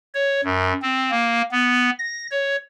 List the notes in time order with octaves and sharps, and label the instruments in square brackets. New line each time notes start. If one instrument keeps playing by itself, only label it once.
[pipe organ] C#5
F#2
C4
A#3
B3
A#6
C#5